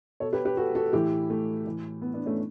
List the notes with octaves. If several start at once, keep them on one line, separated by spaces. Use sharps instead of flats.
B2 A4 C#5
G4 B4
G4 B4
F#4 A4
F#4 A4
A2 E3 E4 G4
A3
A2 E3
B3
B3 D4
A3 C#4